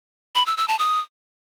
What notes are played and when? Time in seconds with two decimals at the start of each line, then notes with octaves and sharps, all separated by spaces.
0.35 B5
0.46 E6
0.57 E6
0.68 A5
0.79 D#6